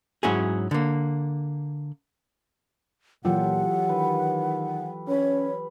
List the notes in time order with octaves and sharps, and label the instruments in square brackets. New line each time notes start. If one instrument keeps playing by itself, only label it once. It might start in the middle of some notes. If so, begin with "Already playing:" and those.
[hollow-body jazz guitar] G#2 F#3 C#4 E4 F#4 G#4
D3 A#3
[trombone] A#2 [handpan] E3 F#3 F4 [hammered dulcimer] G4 A4 [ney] F#5
[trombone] D#3 [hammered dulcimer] B4
[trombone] C#4 [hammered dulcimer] B4 B5 [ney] C#5